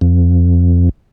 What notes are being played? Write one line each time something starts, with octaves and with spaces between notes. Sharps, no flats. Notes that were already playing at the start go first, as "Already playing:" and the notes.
F2